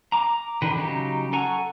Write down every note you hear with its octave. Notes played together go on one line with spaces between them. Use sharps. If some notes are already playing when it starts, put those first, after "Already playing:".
A#5 D6
D3 D#3 B4
C#3 F#3 D#4 G4
A4 F#5 G#5 A#5 C#6